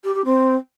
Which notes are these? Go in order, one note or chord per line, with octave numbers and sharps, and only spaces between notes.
G4
G4
C4